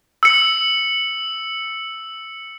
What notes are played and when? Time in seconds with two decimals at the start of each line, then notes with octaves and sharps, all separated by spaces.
0.23 E6 C#7